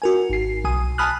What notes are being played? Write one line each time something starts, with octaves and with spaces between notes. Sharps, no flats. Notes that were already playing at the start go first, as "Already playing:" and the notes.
F#4 A#4 G#5
G#1 C7
B1 G#5 D#6
G#5 A5 B5 D#6 F6 F#6